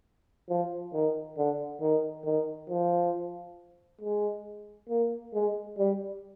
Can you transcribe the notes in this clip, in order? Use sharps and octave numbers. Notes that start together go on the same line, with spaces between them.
F3
D#3
D3
D#3
D#3
F3
G#3
A#3
G#3
G3